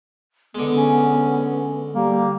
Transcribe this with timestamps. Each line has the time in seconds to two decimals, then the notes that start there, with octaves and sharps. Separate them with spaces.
0.55 D3 G#3 B3
0.76 C#4
1.94 G3 A#3